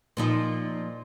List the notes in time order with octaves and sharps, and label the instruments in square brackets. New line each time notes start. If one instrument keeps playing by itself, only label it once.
[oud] A#2 F3 D#4